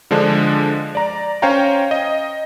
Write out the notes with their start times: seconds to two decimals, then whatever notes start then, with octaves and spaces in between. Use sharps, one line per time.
0.11 D3 F3 G#3 D4
0.95 D5 A#5
1.42 C#4 C5 C#5 F5 G5 A#5
1.91 D#5